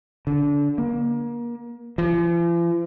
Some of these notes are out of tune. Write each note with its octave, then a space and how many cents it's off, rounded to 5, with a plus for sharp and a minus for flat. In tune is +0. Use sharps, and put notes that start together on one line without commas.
D3 -25
A#3 +30
F3 -45